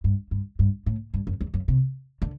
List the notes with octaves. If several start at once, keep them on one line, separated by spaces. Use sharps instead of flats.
G2
G2
G2
A2
G2
F#2
E2
F#2
C3
D3